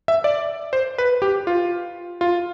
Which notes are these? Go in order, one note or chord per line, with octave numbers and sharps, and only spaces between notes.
E5
D5
C5
B4
G4
F4
F4